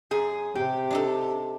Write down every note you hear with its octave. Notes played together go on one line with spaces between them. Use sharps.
F#2 G#4
C3 G4
D4 D#4 A4